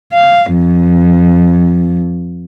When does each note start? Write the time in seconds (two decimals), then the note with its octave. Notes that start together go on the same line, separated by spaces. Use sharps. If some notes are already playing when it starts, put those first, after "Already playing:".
0.13 F5
0.53 F2